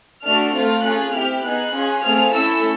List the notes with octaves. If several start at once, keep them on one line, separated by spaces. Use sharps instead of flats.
A3 D4 F#4 A4 F6
A3 C4 F4 F6
C#4 F4 G#4 F#6
C4 E4 G4 F6
B3 D#4 G#4 F#6
C#4 F4 G#4
A3 C4 F4 G#4 F6
A3 C#4 E4 A4 E6